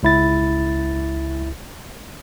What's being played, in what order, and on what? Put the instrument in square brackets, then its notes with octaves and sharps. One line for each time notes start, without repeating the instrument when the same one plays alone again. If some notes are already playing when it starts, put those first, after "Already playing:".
[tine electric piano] C#2 E4 A6